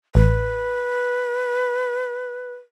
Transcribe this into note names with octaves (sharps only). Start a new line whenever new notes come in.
A1 B4